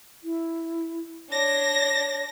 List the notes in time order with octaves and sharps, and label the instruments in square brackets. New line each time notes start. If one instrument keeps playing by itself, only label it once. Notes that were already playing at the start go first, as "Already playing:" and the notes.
[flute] E4
[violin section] D4 A#6 [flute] C#5